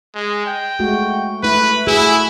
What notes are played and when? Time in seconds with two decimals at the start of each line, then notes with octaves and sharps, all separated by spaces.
0.15 G#3
0.46 G5
0.79 G#3 A3 F#4
1.43 A3 E4 B4
1.87 A3 E4 F#4 G#4